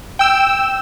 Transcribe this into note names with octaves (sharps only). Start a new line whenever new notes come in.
G5 E6